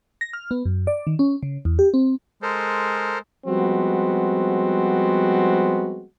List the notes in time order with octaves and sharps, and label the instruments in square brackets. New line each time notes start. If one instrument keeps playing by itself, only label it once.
[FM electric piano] A#6
F6
B3
F#2
D5
D#3
C#4
C#3
E2
G4
C4
[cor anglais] G#3 [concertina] A4 A#4 C5
[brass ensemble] F3 G3 G#3 B3 C4 F#4